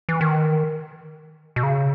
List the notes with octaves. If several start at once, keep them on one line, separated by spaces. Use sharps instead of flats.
E3
D#3
B2
C#3